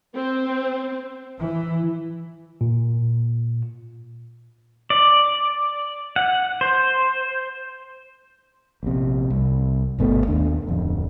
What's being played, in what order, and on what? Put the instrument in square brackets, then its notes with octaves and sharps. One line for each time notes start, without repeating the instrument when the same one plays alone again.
[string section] C4
[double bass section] E3
[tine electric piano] A#2
[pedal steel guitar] D5
F#5
C5
[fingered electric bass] A#1 C3
C2
G1 B2 A3 B3
D#2 D4
D1 F2